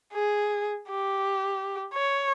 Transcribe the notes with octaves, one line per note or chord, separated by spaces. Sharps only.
G#4
G4
C#5